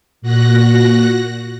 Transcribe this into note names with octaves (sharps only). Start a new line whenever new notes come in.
A#2 F#4 F#6 A#6